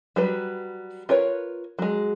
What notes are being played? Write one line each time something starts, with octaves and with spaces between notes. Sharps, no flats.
F#3 G3 B4
F4 A#4 B4 C#5
F#3 G#3